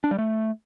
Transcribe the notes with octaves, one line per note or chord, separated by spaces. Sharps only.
D4
G3
A3